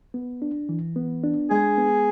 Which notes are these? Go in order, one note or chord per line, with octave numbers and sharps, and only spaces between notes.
B3
D4
E3
B3
D4
G#3 G#4
B3